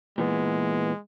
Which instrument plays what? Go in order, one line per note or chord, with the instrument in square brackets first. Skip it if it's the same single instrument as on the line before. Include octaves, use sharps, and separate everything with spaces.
[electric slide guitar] A#2 E3 B3 [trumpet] G#3